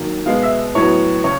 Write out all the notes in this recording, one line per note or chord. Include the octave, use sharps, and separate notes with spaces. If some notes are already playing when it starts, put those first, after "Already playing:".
Already playing: D#3 F#3 A#3
B2 G#3 B3 F5
E5
A2 F#3 B3 C#5
C#3 C#5